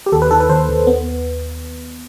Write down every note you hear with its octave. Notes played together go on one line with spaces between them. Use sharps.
G4
D#2 A4
B4
D#3 A4
B4
D#2 C5
D#2
B3